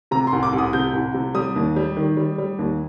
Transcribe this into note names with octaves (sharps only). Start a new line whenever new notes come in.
C3 A#5
C6
C2
D6
C2
D#6
C3 G6
C2
C3
G3 D#6
D#2
G3
D#3
G3
G3
D#2